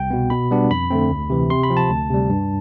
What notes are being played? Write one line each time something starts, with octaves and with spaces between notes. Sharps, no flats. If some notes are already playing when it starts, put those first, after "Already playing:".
Already playing: C2 G5
B2 B3
B2 B5
G3 B3 D4
F2 B5
D3 A3 C4
D2
C3 E3
C3 C6
B5
F3 C4
A5
D2
C3 G3
G2